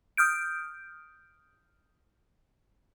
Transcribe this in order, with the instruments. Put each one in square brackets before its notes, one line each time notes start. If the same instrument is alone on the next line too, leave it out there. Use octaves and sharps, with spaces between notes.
[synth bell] D#6 F6 G6 D7